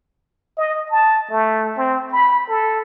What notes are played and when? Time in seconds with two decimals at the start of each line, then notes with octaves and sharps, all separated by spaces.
0.58 D#5
0.91 A5
1.31 A3
1.77 C4
2.12 B5
2.49 A4